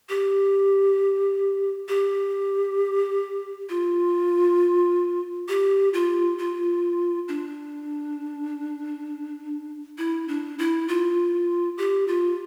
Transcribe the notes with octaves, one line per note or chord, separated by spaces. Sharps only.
G4
G4
F4
G4
F4
F4
D4
E4
D4
E4
F4
G4
F4